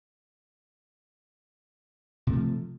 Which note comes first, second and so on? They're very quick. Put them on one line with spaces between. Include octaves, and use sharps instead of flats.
C3 A3 D#3 F3